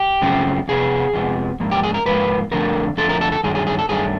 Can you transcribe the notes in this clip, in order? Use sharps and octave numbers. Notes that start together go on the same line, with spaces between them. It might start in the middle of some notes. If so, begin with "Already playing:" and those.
Already playing: G4
F#2 C#3 F3 A3 C4
F2 C3 B3 G#4
F2 C3 F3 G#3 B3
G#2 F3 A#3
G4
G#4
A#4
G#2 F3 A#3 B4
F2 D3 F3 A3 A#4
F2 D3 F3 A3 A4
A#4
A4
A4
G2 D#3 F#3 A3 G#4
G#4
G#4
A4
G2 D#3 F#3 A3 G#4